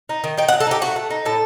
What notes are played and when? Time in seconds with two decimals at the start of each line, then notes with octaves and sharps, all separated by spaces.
0.09 D#4
0.24 D#3
0.37 D#4 G5
0.48 F#5
0.53 F#3
0.60 A4
0.67 D#4 G4
0.81 A3 F#4
0.96 A3
1.10 D#4
1.25 A2 A4